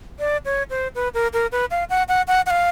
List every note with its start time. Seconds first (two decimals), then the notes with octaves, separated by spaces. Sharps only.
0.20 D5
0.45 C#5
0.70 C5
0.95 B4
1.14 A#4
1.33 A#4
1.52 B4
1.71 F5
1.90 F#5
2.08 F#5
2.28 F#5
2.46 F#5
2.50 F5